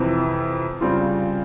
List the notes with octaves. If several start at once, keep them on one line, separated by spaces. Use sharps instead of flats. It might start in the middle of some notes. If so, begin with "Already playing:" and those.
Already playing: F2 C3 E3
C#3 G3 C4 F4